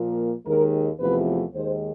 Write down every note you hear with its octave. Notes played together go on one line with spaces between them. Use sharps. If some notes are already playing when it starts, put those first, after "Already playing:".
Already playing: A#2 F3 A#3
D#2 D#3 G#3 A#4
E2 C3 F3 A3 B4
D#2 D#3 G#3 C5